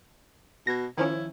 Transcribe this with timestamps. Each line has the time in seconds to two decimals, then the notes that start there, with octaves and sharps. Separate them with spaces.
0.67 B2 G#6 A#6
0.97 D#3 F3 C#4 E4